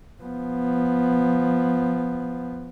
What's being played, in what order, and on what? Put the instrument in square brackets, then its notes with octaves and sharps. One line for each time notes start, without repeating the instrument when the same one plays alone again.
[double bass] F3 B3